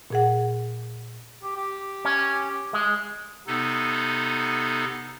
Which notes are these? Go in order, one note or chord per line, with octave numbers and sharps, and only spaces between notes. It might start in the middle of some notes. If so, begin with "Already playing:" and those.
A#2 G#4 F#5
G4
G4
C#4
G#3
C3 B3 D#4 A4